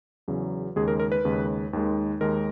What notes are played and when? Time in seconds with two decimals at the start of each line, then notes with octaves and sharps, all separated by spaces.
0.28 E2 C#3 F#3
0.76 D#2 C#3 G#3 G#4
0.88 A#4
1.00 A#4
1.12 B4
1.25 D#2 C#3 G#3
1.73 D#2 D#3 G#3
2.21 D#2 D#3 G#3 A#4